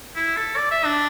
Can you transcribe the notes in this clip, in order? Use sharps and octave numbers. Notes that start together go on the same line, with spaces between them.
E4
A4
D5
E5
D4